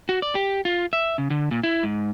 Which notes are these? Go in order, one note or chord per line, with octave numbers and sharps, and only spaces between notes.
F#4
D5
G4
F4
E5
C#3
D3
A#2
E4
G#2